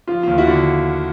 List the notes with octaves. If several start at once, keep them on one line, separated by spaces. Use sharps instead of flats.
F3 F4
D#2 F4
E4 F#4
D3